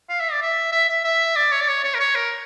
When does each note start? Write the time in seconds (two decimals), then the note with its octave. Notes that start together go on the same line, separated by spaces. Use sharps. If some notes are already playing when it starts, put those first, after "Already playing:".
0.09 F5
0.20 E5
0.32 D5
0.42 E5
0.72 E5
0.89 E5
1.05 E5
1.36 D5
1.52 C#5
1.61 D5
1.68 C#5
1.84 C#5
1.95 A#4
2.00 C#5
2.15 A#4